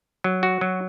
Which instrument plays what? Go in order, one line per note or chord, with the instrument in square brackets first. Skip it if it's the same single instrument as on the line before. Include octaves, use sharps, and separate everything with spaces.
[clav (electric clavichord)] F#3
F#4
F#3